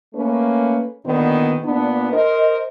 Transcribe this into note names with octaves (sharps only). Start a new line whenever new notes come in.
A3 A#3 C#4 B4
A#2 D3 D#3 B3
A#2 B3 D4
A#4 C5 D#5